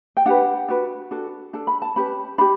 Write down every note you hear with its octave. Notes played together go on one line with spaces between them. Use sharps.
G5
D4 G4 B4 F#5
D4 F#4 B4
D4 F#4 A4
D4 A4 A5
B5
A5
C#4 G4 B4 B5
D4 G4 B5